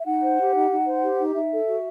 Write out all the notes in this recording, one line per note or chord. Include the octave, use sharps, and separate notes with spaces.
E5
D#4 F#5
C5
G4
D#4
D#4
C5
G4
D#4
D#4 E5
A4
F#4